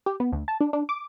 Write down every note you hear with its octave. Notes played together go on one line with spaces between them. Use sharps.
G4
B3
D2
A5
D4
D4
D6